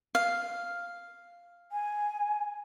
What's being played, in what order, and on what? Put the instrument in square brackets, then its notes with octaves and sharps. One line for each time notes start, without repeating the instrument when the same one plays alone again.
[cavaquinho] F5
[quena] G#5